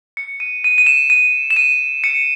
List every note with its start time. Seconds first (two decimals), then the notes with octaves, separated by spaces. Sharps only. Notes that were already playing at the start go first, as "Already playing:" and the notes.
0.17 C#7
0.40 D#7
0.64 D#7
0.78 D#7
0.87 E7
1.10 D#7
1.51 E7
1.56 D#7
2.04 C#7